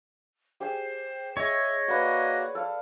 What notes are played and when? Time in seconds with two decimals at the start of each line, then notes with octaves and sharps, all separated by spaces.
0.60 G4 G#4 C5 G#5
1.37 G#4 C#5 D#5 E5
1.88 A#3 F#4 B4 D5
2.55 A4 D5 F5